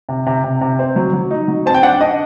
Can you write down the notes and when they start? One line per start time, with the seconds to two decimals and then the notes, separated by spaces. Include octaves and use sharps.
0.09 C3
0.26 C3
0.44 C3
0.61 C3
0.79 C4
0.96 F#3
1.13 F#3
1.31 D#4
1.48 F#3
1.66 C4 A5
1.74 G5
1.83 D4 F#5
2.01 D4 D#5